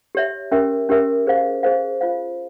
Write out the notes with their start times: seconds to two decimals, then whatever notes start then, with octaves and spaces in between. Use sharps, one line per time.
0.15 G4 C#5 E5
0.52 C#4 G4 A#4 E5
0.89 C#4 G4 A#4 E5
1.27 G#4 C5 F5
1.63 G#4 C5 F5
2.01 F4 C5 F5